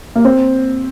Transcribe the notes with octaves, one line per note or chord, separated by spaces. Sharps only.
A#3
C4